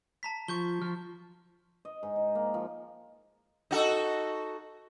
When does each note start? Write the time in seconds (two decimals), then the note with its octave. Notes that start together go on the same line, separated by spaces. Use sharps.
0.23 A5 A#5 B6
0.48 F3 C#6 G6 G7
0.82 F3 F6
1.85 D#5
2.03 G#2
2.16 D#4
2.35 A#3
2.54 F3
3.71 D#4 F#4 A4